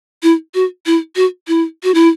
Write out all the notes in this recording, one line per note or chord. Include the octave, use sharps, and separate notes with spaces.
E4
F#4
E4
F#4
E4
F#4
E4